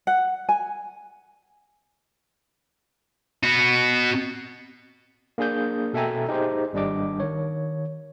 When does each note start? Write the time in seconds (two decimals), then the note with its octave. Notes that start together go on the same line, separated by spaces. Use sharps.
0.07 F#5
0.49 G#5
3.43 B3 F#4
5.38 A#3 D4 G#4 D#6 G6
5.93 B2 A4 E5 G5 G#5 A#5
6.28 D#4 G4 G#4 C5
6.73 G#1 G3 D4 D#5 D6
7.20 D#3 C#5